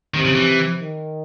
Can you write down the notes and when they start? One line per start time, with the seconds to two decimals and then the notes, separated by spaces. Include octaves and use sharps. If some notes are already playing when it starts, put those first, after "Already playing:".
0.14 C3 D#3
0.25 C#3
0.35 E3
0.79 D#3